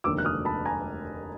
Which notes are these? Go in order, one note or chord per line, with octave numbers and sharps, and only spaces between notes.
F1 D#2 D3 D6 E6
F#6
D#6 F6
A5 B5
G#5 A#5